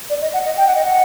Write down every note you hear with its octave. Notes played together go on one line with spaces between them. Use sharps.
D5
D#5
F#5
D#5
G5
F#5
D#5
F#5